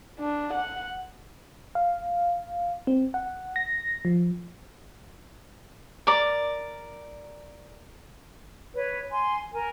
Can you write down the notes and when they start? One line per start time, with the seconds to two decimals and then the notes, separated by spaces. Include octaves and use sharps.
0.19 D4
0.54 F#5
1.75 F5
2.87 C4
3.14 F#5
3.56 A#6
4.05 F3
6.07 A#4 D5
8.74 B4 C#5
9.11 G#5 C6
9.51 A#4 G#5